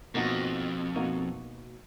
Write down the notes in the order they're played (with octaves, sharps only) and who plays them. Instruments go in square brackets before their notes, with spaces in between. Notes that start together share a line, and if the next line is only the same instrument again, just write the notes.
[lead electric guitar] F2 [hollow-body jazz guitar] B2 A#3 D#4 F#4
[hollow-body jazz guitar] B2 A#3 D#4 F#4